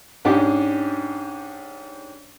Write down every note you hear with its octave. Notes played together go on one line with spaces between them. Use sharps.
G#2 C#4 D4 G4 D#5 D6